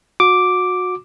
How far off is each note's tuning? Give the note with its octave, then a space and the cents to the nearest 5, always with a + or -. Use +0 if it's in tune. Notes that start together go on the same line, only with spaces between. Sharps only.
F#4 -25 D6 +0